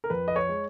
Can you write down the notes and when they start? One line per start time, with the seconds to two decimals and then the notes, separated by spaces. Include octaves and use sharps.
0.04 A#4
0.10 F2 B4
0.28 D#5
0.36 C#5
0.49 G#3